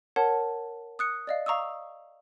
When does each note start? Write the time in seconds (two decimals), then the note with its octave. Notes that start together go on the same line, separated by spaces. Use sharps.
0.16 A#4 C#5 F#5 A5
0.99 D#6 F#6 C#7
1.27 D5 D#5 F5
1.46 F5 A#5 C#6 D#6 E6